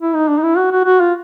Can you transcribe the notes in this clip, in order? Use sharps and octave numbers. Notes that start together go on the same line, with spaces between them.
E4
D#4
D4
D#4
E4
F#4
F#4
F#4
F4